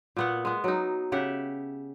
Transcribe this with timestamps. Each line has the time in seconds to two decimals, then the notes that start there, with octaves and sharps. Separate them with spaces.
0.16 A#2 B3 F#5
0.45 G#3 B3
0.64 F#3 D#4
1.12 C#3 G4 E5 F#5